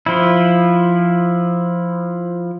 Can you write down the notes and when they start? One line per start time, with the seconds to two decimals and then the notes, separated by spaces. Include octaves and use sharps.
0.06 F3 E4